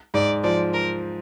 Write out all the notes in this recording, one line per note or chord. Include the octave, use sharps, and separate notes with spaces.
G#2 D5
F3 D5
A#4